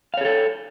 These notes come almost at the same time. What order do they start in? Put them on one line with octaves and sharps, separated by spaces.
F5 C#5 G#4 A4